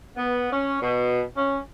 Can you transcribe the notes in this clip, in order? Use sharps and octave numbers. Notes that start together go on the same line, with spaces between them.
B3
C#4
B2
C#4